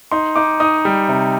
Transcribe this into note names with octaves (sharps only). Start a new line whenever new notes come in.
D#4 C6
D#4 D6
D#4 D#6
G3
C3